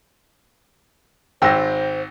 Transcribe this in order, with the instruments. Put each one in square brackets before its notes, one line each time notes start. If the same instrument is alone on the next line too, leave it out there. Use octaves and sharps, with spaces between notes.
[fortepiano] G#1 G#2 E6 [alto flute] C5 [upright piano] G5 A#6